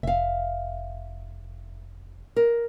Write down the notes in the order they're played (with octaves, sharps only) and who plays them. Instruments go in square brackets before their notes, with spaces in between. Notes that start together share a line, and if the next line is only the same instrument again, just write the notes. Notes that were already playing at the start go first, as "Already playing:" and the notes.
[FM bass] F1 [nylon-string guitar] E5 F5
[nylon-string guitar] A#4